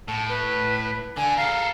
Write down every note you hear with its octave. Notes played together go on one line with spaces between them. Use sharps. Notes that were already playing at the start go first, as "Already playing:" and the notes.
A2 A5
B4
D3 G#5
A4 A#4 F5